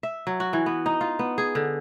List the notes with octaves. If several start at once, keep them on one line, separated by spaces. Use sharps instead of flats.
E5
F#3
F#4
E3
B3
D#4
F4
B3
G#4
D3